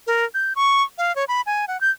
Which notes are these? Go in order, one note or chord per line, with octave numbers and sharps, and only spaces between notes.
A#4
G6
C#6
F5
C#5
B5
G#5
F#5
G6